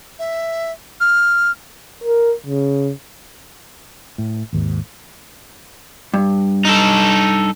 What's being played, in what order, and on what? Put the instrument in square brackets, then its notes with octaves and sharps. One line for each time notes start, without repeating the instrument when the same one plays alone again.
[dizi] E5
F6
[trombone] A#4
C#3
[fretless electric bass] A2
G#1 D#2 G#2
[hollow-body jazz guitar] G2
[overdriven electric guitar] D#4 A4